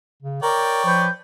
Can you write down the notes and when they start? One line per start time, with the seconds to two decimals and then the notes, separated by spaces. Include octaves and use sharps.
0.22 C#3
0.42 A#4 C#5 D5 G5
0.85 F3 B4 C#6 G6